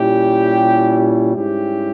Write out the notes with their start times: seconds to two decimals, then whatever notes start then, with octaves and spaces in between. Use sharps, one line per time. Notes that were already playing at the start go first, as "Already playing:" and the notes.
Already playing: A#2 G3 C#4 E4 G4
1.33 G#2 G3 C#4 E4 G4